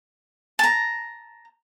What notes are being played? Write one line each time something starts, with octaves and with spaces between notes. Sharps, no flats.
A5 A#5